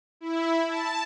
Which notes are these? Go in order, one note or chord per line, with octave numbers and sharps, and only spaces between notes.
E4
A5